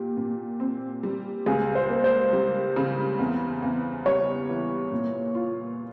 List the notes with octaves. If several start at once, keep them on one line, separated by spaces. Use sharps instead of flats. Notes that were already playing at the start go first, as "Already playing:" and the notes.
Already playing: A#2 G4
A#2
C4
G3
C#2 G#4
C5
A#3
C5
G3
C#3
E2
E2
G3 C#5
E3
A#2
F4